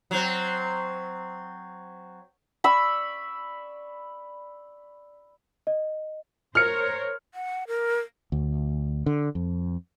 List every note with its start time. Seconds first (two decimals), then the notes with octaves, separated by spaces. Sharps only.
0.11 F#3 C4
2.64 D5 B5 C#6 E6
5.67 D#5
6.55 A#4 C5 C#5 F6 C#7
7.34 F#5
7.67 A#4
8.32 D2
9.06 D3
9.35 F2